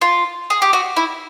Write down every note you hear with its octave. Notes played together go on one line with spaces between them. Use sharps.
F4
G#4
G4
F#4
E4